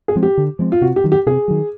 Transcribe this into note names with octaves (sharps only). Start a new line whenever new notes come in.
G#4
F3 G#3 C4
G4
D3
F3 G#3 C4
F4
C3 F#4
G4
D#3 F#3
G4
C3 G#4
D#3 F#3